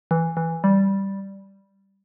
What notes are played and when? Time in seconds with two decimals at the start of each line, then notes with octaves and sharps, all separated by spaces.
0.11 E3
0.37 E3
0.64 G3